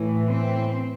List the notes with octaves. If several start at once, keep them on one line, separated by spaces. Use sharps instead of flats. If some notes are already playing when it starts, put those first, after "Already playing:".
Already playing: A2 E3
C4